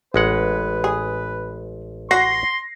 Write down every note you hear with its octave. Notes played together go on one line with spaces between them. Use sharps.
A1 G#3 B4 F#5
G#4
F#4 C6 A#6 C7